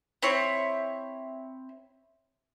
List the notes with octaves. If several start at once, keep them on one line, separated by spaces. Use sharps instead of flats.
C4 E4 C#5